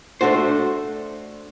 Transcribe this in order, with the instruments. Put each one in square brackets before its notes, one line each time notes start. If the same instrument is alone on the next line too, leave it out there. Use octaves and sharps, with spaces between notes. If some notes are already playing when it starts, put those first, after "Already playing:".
[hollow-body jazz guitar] A3 D4 F#4 C5